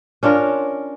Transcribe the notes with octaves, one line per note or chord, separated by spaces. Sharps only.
C#4 D4 F4 A#4